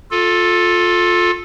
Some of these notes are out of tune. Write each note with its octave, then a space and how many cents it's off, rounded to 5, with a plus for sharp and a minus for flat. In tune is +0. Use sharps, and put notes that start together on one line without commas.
F4 +20 A4 -5